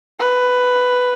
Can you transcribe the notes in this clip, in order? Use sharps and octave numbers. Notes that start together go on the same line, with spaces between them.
B4